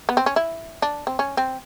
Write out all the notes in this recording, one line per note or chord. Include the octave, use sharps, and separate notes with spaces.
B3
C4
C#4
E4
D4
C4
C#4
C4